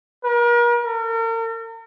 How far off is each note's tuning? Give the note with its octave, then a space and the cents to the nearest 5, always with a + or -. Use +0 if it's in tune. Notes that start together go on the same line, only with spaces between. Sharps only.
A#4 +40
A#4 -40